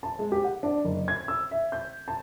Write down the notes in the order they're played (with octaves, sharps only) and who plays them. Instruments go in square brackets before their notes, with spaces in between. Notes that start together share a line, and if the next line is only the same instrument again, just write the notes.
[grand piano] A5
G#3
G4
F#5
D4
F#1
G#6
E6
E5
G6
A5